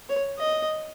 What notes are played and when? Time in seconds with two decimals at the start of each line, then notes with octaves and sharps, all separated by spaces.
0.09 C#5
0.38 D#5